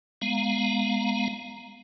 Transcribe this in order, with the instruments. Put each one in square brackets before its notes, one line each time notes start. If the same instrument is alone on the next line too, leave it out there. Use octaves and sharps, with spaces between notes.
[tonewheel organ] G#3 B3 F5 A#5